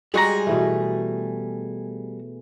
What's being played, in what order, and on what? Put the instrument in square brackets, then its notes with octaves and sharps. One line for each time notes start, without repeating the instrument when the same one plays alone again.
[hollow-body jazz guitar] G3 F#4 A#5 [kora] G#3 [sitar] G#4
[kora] B2 E3 A3